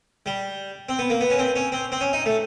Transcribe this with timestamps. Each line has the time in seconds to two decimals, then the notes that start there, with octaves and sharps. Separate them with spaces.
0.26 G3
0.89 C4
0.99 B3
1.10 A#3
1.21 B3
1.30 C#4
1.38 C4
1.55 C#4
1.72 C4
1.92 C4
2.01 C#4
2.13 D#4
2.26 A3